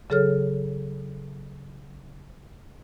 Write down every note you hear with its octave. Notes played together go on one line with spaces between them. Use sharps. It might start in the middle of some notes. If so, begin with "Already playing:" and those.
C#3 F#3 G#4 A4 C#5 F6